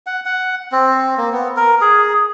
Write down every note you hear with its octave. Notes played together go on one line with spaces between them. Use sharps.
F#5
F#5
C4
A#3
B3
A#4
G#4